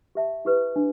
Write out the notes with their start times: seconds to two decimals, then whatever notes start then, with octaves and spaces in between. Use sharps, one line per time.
0.15 G4 E5 A5
0.45 E4 G4 B4
0.76 D4